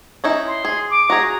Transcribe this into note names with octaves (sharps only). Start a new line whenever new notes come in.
C#4 D#4 E4
C6
G#4
D6
F#4 G#4 A#5